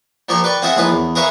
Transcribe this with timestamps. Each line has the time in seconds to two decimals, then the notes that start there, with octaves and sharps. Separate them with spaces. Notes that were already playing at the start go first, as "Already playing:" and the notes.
0.29 A#2 F3 A#3 G4 C#6
0.44 B4 D5 G5 C#6
0.62 C4 F4 G#4 C5 E5 F#5
0.77 A#1 A2 D#3 G#4 B4 B5
0.89 E2
1.15 G#4 A#4 B4 C#5 E5 F5